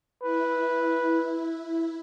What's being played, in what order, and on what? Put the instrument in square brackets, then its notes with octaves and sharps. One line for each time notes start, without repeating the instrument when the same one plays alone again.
[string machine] E4 [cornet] B4